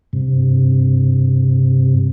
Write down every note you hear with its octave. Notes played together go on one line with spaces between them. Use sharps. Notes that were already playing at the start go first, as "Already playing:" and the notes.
G2 C3